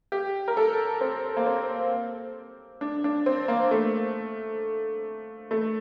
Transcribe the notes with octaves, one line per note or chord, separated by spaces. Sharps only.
G4
A#4
A4
C4
A#3
C4
D4
D4
C4
A#3
A3
A3